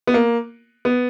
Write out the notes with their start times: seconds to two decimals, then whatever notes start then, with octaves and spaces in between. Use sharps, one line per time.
0.07 B3
0.14 A#3
0.85 B3